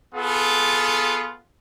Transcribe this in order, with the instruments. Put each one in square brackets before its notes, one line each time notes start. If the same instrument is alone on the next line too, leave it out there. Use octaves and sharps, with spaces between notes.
[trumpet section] B3 F4 G#4 A4